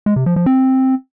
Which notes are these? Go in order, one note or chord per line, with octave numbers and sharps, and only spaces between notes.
G#3
C3
F3
F3
C4